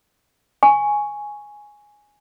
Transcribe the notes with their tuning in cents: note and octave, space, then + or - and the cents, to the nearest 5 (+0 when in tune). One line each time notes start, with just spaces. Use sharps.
G#5 +0 C#6 +0